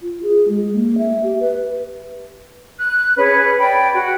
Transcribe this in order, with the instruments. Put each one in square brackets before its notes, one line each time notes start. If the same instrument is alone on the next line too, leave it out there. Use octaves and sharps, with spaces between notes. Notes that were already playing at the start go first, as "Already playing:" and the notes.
[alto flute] F4
G#4
G#3
A#3
E5
G4
B4
[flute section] F#6
C#4 G#4 B4
D5 G5 B5
F#4